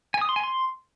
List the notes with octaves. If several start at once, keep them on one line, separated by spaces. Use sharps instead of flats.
G#5
D#6
C6
G#5
C6